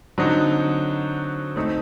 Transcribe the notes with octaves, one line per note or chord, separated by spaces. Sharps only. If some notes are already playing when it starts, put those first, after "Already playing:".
D3 F#3 C4 D#4
A3 C4 D#4